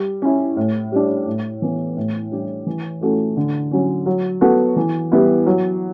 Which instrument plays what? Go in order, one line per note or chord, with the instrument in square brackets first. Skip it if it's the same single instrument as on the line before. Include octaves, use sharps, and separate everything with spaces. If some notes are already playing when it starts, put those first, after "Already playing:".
Already playing: [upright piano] G3
C#4 E4
A2
G3 D4
A2
E3 B3
A2
G3 D4 G4
E3
A3 C#4 F#4 A4
D3
F#3 C#4
F#3
B3 F#4 A4
E3
G3 B3 E4
F#3